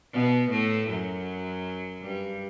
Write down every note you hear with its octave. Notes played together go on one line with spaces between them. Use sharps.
B2 B3
A2 A3
F#2 F#3
G2 G3